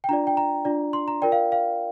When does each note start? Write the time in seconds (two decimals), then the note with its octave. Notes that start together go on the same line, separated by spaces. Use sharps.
0.04 G5
0.09 D4 F4 D5 A#5
0.27 G5
0.37 A#5
0.65 D4 F4 D5
0.93 C6
1.08 A#5
1.22 F4 A#4 D5 G5
1.32 F5
1.52 F5